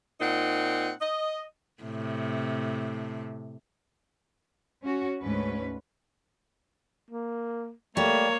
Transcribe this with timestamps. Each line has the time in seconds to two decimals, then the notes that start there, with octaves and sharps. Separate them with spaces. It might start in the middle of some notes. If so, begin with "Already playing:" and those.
0.20 A#2 C4 D#4 F#5
1.01 D#5
1.83 A2 C3
4.83 C#4 F#4
5.21 D2 G#2 C#4 B4
7.11 A#3
7.97 G3 A3 A#3 C#5